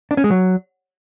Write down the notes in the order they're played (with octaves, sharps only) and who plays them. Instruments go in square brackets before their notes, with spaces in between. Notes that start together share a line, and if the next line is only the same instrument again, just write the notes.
[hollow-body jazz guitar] D4
C#4
G#3
F#3